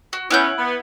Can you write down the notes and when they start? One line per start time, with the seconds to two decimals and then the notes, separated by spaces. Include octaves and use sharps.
0.13 F#4
0.30 B3 C#4 E4 F#5 G6
0.58 B3